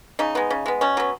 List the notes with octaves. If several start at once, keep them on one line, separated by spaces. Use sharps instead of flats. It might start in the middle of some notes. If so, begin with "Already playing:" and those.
C#3 D#4
G#3 B3
C#3
G#3 B3
B2 C#4
F#3 B3